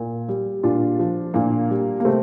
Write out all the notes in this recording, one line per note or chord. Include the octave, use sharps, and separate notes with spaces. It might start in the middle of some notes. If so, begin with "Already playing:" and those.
Already playing: A#2
G3
A#2 D4 F4
F3
A#2 A#3 D4
G3
A#3
C3 A3 C4